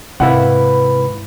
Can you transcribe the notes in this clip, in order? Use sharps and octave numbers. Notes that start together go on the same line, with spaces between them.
G#2 C3 E4 B4 F5 F#5 B5